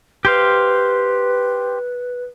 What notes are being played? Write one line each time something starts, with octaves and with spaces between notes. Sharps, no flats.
G4 B4 C5 F5